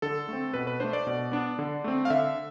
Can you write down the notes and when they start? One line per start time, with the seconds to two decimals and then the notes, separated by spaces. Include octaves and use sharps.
0.02 D3 A4
0.28 A3 C4
0.54 B2 B4
0.67 B4
0.80 A3 D4 C5
0.93 D5
1.07 B2
1.32 B3 D4
1.59 D3
1.84 A3 C4
2.05 F5
2.10 D3 E5